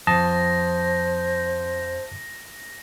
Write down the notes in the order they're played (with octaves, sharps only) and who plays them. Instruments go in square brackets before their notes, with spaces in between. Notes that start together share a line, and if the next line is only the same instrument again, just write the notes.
[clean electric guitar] F2 [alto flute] C5 [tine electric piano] A5 D#6 [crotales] A#6